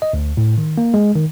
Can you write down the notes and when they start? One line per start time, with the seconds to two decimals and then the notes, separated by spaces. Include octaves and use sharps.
0.02 D#5
0.13 D2
0.37 A2
0.58 D#3
0.78 A#3
0.94 G#3
1.15 D#3